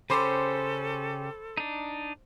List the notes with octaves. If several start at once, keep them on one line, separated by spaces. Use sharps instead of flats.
C#3 C#4 G4 A4 C5 B5 C6 D6
D4 D#4